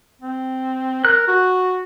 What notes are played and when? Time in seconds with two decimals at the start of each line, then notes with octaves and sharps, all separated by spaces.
0.22 C4
1.05 A#4 F#6
1.28 F#4